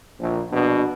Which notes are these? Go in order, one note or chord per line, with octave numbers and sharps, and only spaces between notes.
A#1
A#1 B2 D4